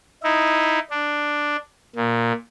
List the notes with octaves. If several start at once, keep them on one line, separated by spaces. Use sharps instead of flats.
D#4 E4
D4
A#2